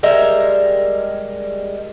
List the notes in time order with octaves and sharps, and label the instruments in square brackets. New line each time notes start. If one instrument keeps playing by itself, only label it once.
[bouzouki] G3 G#3 A#4 E5